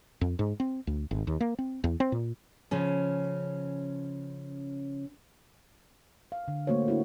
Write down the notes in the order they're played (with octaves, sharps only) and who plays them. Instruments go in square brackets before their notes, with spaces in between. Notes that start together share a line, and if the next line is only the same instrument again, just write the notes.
[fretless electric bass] F2
G#2
C4
D2
G#1
D#2
A#3
C4
E2
C4
A#2
[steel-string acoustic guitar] C#3 F3 C#4
[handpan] F5
D3
A3 A#3 F#4 C5 C#5
D4 E4 F#4